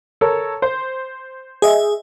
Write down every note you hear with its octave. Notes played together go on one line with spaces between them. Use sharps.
A4 A#4 C#5
C5
G#4 D#5 E5